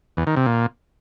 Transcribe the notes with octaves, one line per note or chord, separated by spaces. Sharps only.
E2
D#3
C3
A#2